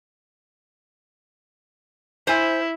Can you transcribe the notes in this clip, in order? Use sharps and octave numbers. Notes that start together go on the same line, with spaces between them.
E4 C5 G#5